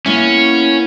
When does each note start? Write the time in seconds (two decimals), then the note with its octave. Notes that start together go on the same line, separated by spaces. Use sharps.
0.06 A#3 B3 C#4 E4